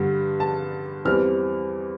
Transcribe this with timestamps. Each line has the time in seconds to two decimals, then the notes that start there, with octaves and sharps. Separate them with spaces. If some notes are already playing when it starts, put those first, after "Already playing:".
Already playing: G2 D3 G3
0.40 A5
1.05 E2 E3 G3 C4 F6